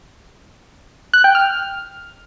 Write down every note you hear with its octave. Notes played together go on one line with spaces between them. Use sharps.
F#6
G5
F6